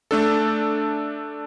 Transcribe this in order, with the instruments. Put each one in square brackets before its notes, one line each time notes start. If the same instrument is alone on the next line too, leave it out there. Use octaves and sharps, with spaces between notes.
[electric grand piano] A3 D4 A4